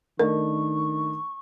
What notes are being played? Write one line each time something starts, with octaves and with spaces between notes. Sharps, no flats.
D#3 A3 D4 D#4 A#4 C#6